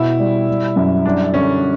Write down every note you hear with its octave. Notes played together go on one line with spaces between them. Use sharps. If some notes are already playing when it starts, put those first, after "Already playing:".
Already playing: B2 E4
G3
G3
F#2
G3 D4
D3 C#4